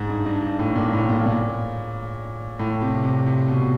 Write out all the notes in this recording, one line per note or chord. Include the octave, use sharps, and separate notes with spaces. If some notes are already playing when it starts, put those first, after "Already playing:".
Already playing: G#2
G2
G2
G2
A2
A#2
A2
A#2
A#2
A2
C3
C3
C3
B2